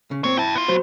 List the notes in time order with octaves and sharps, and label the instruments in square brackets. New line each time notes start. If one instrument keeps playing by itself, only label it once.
[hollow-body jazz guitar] C#3
[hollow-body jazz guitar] A#2 C4 [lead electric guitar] C#5
[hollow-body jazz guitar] E4 [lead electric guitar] G5 A5
[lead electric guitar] B3 F4
[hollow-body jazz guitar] F#3 C5